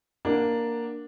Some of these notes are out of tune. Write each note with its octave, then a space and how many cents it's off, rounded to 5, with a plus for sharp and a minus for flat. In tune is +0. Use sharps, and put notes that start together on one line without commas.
A#3 +0 D4 +0 F#5 -10